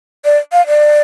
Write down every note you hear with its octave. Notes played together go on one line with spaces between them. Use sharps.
D5
F5
D5